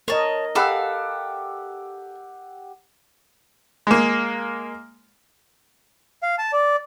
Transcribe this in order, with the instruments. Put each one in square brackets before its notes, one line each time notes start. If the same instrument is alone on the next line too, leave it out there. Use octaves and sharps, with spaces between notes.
[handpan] A#4 D#5 [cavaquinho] C#5 A5
[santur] G4 F#5 E6 [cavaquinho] A4 F5 B5
[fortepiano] G#3 A#3
[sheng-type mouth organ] F5
A5
D5